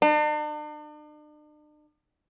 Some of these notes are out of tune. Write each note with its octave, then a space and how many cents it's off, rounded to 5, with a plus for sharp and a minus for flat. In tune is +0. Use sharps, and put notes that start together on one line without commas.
D4 +45